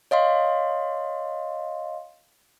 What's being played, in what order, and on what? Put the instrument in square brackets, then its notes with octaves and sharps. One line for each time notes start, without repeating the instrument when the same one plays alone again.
[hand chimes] C#5 D#5 F5 C6